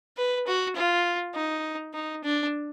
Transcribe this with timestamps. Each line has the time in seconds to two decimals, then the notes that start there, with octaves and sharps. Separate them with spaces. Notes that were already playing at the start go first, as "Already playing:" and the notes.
0.17 B4
0.47 F#4
0.76 F4
1.35 D#4
1.94 D#4
2.24 D4